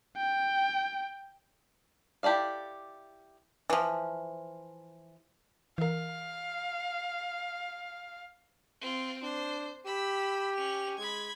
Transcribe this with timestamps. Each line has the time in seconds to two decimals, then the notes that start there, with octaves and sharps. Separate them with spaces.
0.17 G5
2.23 E4 G4 A4 D5 F5
3.70 E3 F3
5.78 E3 A#4 F5
8.81 C4 F4
9.23 D4 C5
9.86 G4 B5 E6
10.56 C#4 F7
10.98 G#3 B5 G#6